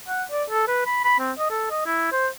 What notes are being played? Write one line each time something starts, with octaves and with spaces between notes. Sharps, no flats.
F#5
D5
A4
B4
B5
B5
C4
D#5
A4
D#5
E4
C5